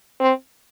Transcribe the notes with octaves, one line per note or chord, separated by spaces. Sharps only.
C4